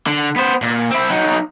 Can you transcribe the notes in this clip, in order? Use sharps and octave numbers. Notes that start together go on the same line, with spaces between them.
D3
B3 C5
A#2
C4 E4
F#3 D#4